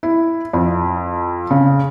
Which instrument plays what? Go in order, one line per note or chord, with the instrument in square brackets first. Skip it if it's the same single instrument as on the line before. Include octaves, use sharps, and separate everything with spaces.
[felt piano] E4
F2
C#3